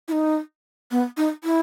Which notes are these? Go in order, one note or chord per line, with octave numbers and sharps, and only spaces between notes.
E4
D#4
B3
D#4
E4